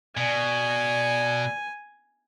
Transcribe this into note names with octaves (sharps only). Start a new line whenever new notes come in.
B2 D5 G#5